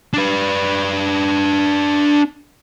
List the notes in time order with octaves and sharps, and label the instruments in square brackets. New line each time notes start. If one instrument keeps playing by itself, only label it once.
[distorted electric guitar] D4 B4